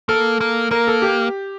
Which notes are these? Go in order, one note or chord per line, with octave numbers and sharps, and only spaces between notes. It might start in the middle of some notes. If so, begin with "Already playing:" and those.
A#3 A4
A#3
A#3 A#4
A4
G4